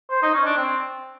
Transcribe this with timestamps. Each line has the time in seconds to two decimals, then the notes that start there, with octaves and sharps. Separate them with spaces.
0.11 C5
0.22 D#4
0.34 C#4
0.45 D4
0.57 C4